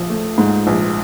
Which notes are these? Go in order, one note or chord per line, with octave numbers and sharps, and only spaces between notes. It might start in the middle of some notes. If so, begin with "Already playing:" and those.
Already playing: A#1 F3
A3
G#2
A#1